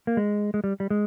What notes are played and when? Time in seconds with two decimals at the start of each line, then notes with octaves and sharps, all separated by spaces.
0.07 A#3
0.17 G#3
0.54 G#3
0.64 G3
0.80 G3
0.90 G#3